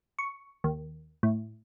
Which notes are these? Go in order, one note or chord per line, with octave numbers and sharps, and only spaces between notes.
C#6
D#2
A2